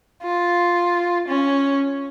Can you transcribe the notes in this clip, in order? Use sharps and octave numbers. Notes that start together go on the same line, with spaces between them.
F4
C#4